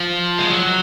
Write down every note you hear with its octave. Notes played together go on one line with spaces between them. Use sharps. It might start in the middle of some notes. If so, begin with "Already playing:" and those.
Already playing: F3
G#3
F#3